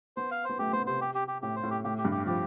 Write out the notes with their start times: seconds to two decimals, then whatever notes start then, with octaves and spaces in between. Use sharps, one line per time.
0.17 B3 C5
0.31 F5
0.44 C5
0.49 B3
0.59 A3 G4
0.72 B3 C5
0.86 C3 C5
1.01 G4
1.15 G4
1.28 G4
1.42 A2 G4
1.56 C5
1.63 A2
1.70 G4
1.84 A2 G4
1.98 G4
2.05 G2
2.12 G4
2.26 F3 G4